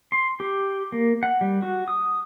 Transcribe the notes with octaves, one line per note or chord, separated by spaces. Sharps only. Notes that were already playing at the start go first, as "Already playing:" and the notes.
C6
G4
A#3
F#5
G3
F#4
D#6